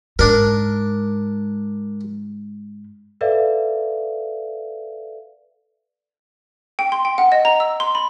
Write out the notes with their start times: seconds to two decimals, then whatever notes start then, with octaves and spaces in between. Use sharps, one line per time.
0.19 G#2 D4 A#4
3.21 A4 B4 D5 E5 F5
6.79 G5
6.92 C6
7.05 G5
7.18 F#5
7.32 D#5
7.45 A#5
7.60 E6
7.80 C6
7.95 B5